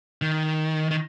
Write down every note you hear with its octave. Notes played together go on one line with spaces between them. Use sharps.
D#3
D#3